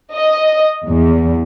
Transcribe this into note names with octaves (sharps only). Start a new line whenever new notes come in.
D#5
E2